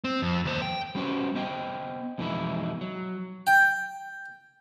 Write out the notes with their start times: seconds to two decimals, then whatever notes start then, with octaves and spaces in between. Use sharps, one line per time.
0.04 C4
0.22 F2
0.45 D#2 C5
0.62 G5
0.95 G3 B3 C#4 F#4 C5
1.35 B3 C5 D#5 G5
2.18 F2 B2 E3 G#3 D#4 E4
2.81 F#3
3.47 G5